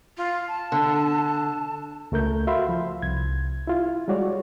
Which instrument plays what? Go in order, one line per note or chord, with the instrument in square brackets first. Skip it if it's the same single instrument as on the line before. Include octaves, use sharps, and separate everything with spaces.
[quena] F4
A5
[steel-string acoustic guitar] D3
[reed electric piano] C#2 A3 A#4 G6
F#4 E5 F5 B5 C6
F3
C2 G#6
E4 F4
G3 G#3 F#4 C#5 D5